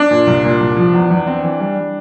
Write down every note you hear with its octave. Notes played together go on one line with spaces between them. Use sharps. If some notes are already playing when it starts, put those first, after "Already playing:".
Already playing: D4
A#2
C2
A#2
C2
F3
E2
E2
C4
E3
G3
G3